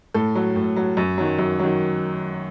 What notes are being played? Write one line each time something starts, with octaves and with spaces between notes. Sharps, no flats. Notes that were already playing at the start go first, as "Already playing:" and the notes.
A2 A4
F#3
A2
F#3
F#2
D#3 F#3
F#2
D#3 F#3